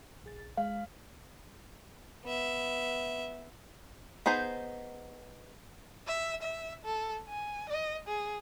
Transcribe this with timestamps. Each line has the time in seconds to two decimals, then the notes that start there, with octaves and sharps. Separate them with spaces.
0.24 A#1 G#4 A6
0.57 G#3 F5
2.24 B3 E5
4.26 B3 D#4 G#4 C5
6.07 E5
6.42 E5
6.85 A4
7.29 G#5
7.69 D#5
8.08 G#4